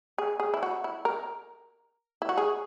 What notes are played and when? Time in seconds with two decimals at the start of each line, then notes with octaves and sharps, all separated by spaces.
0.18 G#4
0.40 G#4
0.54 E4
0.63 F#4
0.84 E4
1.05 A#4
2.22 E4
2.29 F#4
2.37 G#4